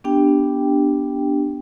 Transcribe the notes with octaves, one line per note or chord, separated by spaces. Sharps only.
B3 D4 G4 G5